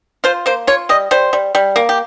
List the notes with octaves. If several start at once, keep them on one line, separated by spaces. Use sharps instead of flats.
F4 C5
A#3 C5
F4 C#5
G3 D#5
G3 C5
G3
G3
A#3
G4